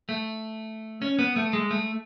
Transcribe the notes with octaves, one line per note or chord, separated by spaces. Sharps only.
A3
C#4
B3
A3
G#3
A3